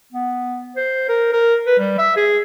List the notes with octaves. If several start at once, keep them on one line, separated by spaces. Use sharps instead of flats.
B3
C5
A#4
A#4
B4
G3
E5
G#4